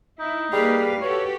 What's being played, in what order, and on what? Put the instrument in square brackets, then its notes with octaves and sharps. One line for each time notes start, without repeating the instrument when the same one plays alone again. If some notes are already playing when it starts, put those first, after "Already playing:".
[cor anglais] D#4 [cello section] E4
[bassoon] G3 [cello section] A#3 B4 F5 [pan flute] G#4
[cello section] F#4 G4 A4 [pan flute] B4 [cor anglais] C#5